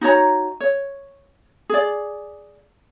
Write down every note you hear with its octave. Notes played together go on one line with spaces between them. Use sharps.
D#4 F#4 C#5 A#5
C#5
G#4 D5